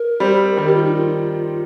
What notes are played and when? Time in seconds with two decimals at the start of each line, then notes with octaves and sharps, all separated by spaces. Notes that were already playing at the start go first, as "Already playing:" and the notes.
Already playing: A#4
0.20 G3 C4
0.57 D#3 G3 A#4
0.67 G4
0.76 F4
0.85 D#4
0.94 F4